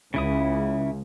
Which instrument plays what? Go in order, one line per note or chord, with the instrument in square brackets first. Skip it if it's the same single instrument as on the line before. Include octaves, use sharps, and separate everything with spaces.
[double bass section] C#2 [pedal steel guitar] C#3 E4 D#6